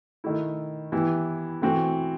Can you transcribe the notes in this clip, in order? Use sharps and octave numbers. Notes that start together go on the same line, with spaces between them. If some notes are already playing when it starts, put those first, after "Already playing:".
D#3 A3 E4
E3 B3 E4 G4
E3 A3 C4 F#4